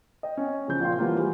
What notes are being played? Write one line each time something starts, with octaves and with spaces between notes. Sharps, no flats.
D#5 G5
C#4
C#3 F3 G6
A#1 A#2 F5 G5 C6
E3 F3 G3 A#3 B3 F4
G3 F#4 G#4